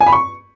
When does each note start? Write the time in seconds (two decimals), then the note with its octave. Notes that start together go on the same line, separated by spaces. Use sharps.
0.01 G#5
0.06 B5
0.12 C#6